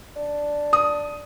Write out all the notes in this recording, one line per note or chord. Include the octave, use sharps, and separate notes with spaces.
D4
D#6